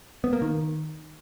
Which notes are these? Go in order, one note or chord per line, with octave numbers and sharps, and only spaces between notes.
B3
A#3
D#3